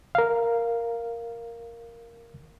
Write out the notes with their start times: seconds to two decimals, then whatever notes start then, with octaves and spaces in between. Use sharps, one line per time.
0.15 A#4 F5